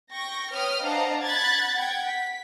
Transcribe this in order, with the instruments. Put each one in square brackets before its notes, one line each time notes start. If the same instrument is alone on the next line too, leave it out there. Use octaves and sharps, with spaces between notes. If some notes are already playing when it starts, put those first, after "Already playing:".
[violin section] G5 C#6 A#6
B4 C#5 G5 D#6 F6
D4 C5 D#5 F5 F#5 A#5
F#5 B5 F#6 G#6 A6
F#5 G5 G#6
B6